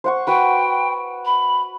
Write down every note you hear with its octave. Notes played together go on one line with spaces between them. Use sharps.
C5 F#5 C#6
F#4 B4 G5
B5